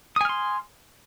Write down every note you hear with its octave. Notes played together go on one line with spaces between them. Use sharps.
G#5 C6 D#6 F6